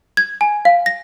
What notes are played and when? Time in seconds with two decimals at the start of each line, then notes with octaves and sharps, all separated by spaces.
0.17 G#6
0.41 G#5
0.65 F5
0.86 A#6